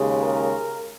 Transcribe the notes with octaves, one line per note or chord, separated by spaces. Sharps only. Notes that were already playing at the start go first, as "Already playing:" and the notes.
Already playing: D#2 C#3 G#3
A#4